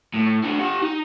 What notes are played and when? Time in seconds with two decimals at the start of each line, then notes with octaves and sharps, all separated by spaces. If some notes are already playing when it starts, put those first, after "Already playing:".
0.14 A2
0.44 D4 F#4
0.59 G4 F#5
0.82 D#4